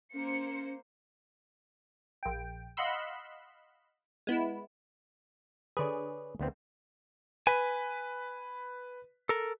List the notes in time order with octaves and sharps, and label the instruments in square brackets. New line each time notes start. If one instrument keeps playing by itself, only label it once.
[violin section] A#3 C5 C#7 [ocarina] C#4
[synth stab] A#1 G5
D#5 F5 F#5 B5 C6 E6
G#3 B3 E4
[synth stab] D3 G#4 [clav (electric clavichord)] B4 C#5 D5
[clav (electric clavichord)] D2 B3 C4
[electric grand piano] B4 B6 [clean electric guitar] G#5
[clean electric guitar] A4 A#4